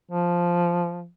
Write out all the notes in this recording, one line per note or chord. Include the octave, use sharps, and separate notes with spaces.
F3